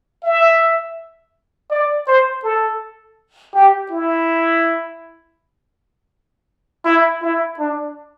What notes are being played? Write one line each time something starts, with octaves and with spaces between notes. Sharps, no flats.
E5
D5
C5
A4
G4
E4
E4
E4
D4